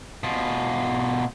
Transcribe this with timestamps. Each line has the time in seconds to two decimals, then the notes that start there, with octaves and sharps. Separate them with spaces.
0.24 B2 F4